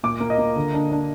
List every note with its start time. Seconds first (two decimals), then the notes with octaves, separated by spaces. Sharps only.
0.04 A#2 D6
0.20 A#3
0.30 D#5
0.38 A#3
0.56 D3
0.74 D4
0.92 D4